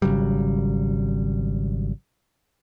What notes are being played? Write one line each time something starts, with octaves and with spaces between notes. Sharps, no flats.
G#1 C#3 F#3 G3